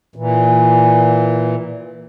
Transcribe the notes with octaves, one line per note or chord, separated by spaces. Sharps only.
A#2 E3